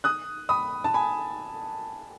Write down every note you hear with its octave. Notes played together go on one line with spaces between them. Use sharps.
D#6 F#6
B5 D#6
A5
G#5 B5